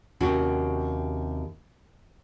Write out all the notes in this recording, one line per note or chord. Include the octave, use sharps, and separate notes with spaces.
D#2 C3 C#4 F#4